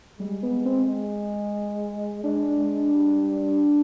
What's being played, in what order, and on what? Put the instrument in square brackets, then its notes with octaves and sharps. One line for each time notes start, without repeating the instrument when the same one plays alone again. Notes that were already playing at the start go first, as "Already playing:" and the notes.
[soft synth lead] G3 [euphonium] G#3
[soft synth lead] B3
C4
[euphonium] G#3
[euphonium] G#3 [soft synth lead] D4
[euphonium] G#3
G3